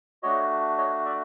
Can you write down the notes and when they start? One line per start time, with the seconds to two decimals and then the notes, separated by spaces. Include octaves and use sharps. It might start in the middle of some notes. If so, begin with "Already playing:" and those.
0.23 A3 D4 F#4 C#5 D#5
0.78 C#5 D#5
1.05 D5 E5